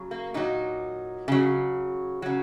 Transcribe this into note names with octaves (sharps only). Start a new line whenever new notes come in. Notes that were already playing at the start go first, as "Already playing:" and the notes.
Already playing: C#3 F#3
A#3
A#2 F#3 D#4
C#3 F#3
C#3 F#3